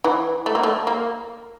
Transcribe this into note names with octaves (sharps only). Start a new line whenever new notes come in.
E3
A3
A#3
A3
A#3